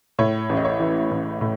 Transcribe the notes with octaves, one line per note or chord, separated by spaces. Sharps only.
A2 C#5
A1
D#5
C#5
E3
A1
A2